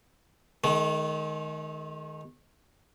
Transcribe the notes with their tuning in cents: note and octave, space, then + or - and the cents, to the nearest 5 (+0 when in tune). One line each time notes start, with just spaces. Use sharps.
D#3 +0 G#3 +45